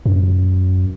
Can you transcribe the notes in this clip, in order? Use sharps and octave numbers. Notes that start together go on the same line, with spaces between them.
F#2